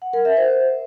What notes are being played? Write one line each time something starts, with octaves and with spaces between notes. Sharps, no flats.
F#5
A#4
E5
C5